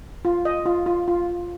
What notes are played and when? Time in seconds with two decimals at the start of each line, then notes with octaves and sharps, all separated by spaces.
0.25 F4
0.45 D#5
0.66 F4
0.86 F4
1.08 F4